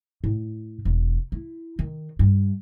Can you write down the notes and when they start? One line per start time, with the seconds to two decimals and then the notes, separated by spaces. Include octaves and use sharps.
0.24 A2
0.85 E1
1.32 E4
1.79 D#3
2.19 G2